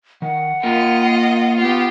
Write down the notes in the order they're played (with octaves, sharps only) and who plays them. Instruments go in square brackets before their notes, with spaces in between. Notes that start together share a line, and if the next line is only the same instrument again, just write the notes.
[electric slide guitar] D#3 [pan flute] F#5
[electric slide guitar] A#3 A#4 G5 [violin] F4 D#5
[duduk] B3 [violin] F4 G4